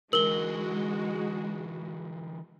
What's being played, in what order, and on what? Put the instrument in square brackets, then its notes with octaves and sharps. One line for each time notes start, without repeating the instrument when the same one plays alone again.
[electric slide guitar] D3 E3 [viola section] G#3 F#4 [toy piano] A#4 [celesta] F#7 G7